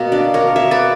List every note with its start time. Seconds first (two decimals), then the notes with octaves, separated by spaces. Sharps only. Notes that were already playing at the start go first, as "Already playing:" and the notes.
Already playing: B2 A#3
0.12 D4
0.34 A#4 C#5
0.56 C#5 E5
0.71 B4 D5